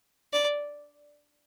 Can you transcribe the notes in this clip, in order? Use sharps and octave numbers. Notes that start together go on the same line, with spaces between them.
D5